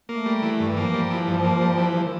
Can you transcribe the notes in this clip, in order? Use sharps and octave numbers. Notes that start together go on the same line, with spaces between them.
A3 A#3
G3
E3
G2
E3
F3 A#3
G3
E3
G2
A#3
G3
E3
D#3